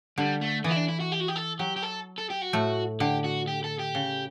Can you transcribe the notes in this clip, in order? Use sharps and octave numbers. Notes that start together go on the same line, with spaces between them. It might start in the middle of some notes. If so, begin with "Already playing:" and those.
D3 G3
A3
E3 B3
E4
D4
E4
F#4
G4
F#4
G4
A4
F#3 G4
G4
A4
A4
G4
F#4
A2 A3
D3 G4
F#4
G4
A4
G4
C#3